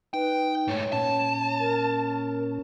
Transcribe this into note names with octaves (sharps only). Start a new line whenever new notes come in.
D#4 B4 G5
G#2 A3 C#5
A#2 C#4 A5
A#4